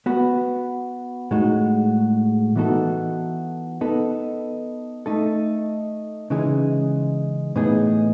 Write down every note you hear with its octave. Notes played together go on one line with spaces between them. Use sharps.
B3 F#4 B4
A2 G#3 D#4 F#4
E3 B3 D#4 F#4 A4
B3 D#4 A4
A3 D#4 A4
C#3 E3 G#3 D#4 G#4
A2 E3 B3 D#4 G#4